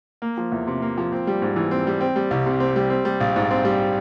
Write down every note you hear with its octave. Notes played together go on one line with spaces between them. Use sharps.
A#3
F3
E2
C3
A#3
F3
C4
G3
G#2
E3
C4
G3
C4
G3
C2
C3
C4
G3
C4
G3
A#1
G#2
C4
G3